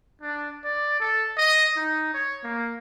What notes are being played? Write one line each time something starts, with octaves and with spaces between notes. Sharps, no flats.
D4
D5
A4
D#5
D#4
C#5
A#3